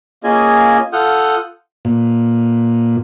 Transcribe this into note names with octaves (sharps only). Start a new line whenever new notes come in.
A#3 C#4 F4 G#4 D#5 G#5
F4 A4 F#5 D#6 F6 G6
A#2